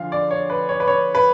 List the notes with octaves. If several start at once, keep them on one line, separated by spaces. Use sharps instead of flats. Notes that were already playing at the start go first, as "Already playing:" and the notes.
Already playing: D2 D3 F3 F5
D5
C#5
B4
C#5
B4
C#5
B4